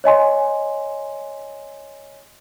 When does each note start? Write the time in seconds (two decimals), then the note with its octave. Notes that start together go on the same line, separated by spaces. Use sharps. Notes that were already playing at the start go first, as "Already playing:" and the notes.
0.04 C#5 D#5 G#5 C6